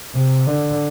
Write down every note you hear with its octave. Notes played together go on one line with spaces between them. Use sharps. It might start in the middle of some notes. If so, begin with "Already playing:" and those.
C3
D3